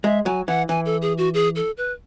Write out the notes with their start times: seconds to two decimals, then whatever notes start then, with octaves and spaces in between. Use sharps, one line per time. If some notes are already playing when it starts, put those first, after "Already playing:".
0.04 G#3 E5
0.26 F#3 G#5
0.47 E3 F#5
0.69 E3 G#5
0.86 A4
1.02 G#4
1.18 F#4
1.34 G#4
1.56 A4
1.77 B4